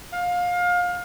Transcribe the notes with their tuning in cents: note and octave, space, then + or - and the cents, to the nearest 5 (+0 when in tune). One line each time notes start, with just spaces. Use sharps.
F5 +25